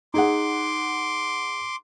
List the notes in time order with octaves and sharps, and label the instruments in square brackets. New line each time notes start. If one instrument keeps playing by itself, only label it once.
[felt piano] D#4 G#4 F#5 [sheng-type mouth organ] C6 D6